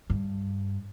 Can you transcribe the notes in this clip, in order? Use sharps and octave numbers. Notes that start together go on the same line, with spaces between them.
G2